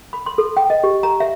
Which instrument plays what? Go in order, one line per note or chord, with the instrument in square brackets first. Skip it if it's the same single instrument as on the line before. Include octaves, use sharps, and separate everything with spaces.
[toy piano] B5
C6
A4
G5
D#5
G4
A#5
E5